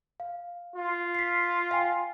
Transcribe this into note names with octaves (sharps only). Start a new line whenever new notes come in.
F5
F4
B6 C7
F5 G5 G#5